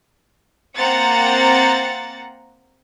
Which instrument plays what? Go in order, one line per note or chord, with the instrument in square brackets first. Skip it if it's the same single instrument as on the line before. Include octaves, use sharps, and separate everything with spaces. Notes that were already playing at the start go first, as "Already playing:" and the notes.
[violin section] A#3 C4 F#5 A#5 A6 C#7